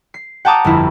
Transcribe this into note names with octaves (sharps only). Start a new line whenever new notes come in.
C7
F#5 G5 A5 A#5 D6 D#6
G1 F2 E4